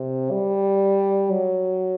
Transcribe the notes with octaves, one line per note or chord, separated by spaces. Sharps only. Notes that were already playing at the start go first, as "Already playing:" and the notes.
Already playing: C3
G3
F#3